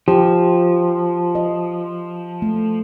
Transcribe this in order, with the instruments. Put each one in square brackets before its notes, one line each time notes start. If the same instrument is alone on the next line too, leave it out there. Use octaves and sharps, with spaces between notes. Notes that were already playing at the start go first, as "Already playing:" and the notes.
[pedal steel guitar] F3 [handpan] G4
[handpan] D#5
A3